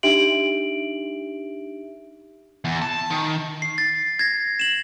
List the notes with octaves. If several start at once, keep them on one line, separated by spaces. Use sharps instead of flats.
D4 D#4 G4 E5 D7 F#7
E2
A5
D#3
C7
A6
G#6 A#6
E7 F#7